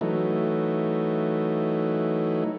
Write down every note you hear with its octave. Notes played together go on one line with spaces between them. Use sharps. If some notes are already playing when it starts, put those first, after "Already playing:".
E3 F#3 A3 D#4